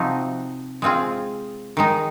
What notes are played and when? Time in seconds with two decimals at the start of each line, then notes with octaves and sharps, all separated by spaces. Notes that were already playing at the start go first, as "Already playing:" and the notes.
Already playing: C3 F3 C4 D#4 F#4
0.82 G#3 C4 F4 G#4
1.77 D#3 G#3 D#4